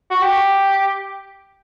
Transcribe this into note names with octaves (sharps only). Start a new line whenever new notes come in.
F#4
G4